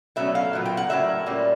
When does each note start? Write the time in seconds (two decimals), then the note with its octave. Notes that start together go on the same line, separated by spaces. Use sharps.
0.16 B2 F#3 A3 C#4 E5
0.35 F5
0.53 A#2 F#3 B3
0.65 G5
0.77 F#5
0.89 A2 F#3 A#3 C#4 E5
1.26 A#2 G3 A#3 C#4